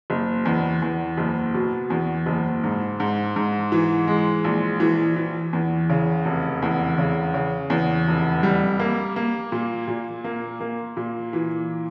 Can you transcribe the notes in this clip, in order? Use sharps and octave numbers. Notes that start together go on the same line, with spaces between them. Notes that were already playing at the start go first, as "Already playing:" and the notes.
F#1
E2
E2
F#1
B2
E2
F#1
G#2
G#2
G#2
E3
G#3
A#1
E3
E3
E2
C#3
F1
E2
C#3
C#3
E2
F1
G3
A#3
A#3
A#2
A#2
A#3
A#3
A#2
E3